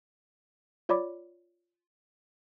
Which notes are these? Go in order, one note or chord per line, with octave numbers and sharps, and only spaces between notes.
F4 C#5 D5 B5 D6